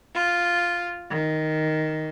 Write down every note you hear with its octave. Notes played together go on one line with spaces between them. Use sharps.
F4
D#3